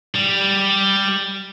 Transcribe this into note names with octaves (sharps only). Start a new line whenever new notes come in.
G3